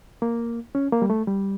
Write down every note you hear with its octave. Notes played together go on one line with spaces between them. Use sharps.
A#3
C#4
A#3
G3
A3
G3